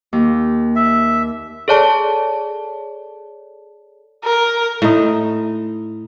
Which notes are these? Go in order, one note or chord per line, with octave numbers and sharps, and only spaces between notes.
D#2
E5
G#4 A4 C#5 D5 A5
A#4
A2 D#4